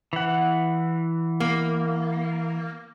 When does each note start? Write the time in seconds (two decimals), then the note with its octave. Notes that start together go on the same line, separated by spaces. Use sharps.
0.13 E3 F#5
1.40 A#3